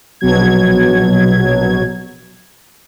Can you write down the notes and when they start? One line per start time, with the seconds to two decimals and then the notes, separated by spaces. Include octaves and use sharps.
0.21 A#1 B2 F#3 G#6